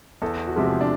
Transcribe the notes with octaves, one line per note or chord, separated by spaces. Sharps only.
E2 A4
F#4
C3 F3 G#3 G4
G#4
D4